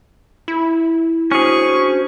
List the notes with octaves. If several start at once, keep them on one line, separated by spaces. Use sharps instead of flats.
E4
C#4 D4 F#4 G#4 C5 C#6